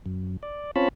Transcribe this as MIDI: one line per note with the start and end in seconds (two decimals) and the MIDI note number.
0.06 0.37 42
0.43 0.71 74
0.76 0.88 60
0.76 0.88 61
0.76 0.88 65
0.76 0.88 73
0.76 0.88 81
0.76 0.88 83